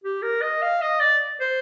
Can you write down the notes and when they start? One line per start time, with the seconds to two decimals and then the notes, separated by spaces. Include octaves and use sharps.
0.04 G4
0.22 A#4
0.42 D#5
0.62 F5
0.81 D#5
1.00 D5
1.40 C5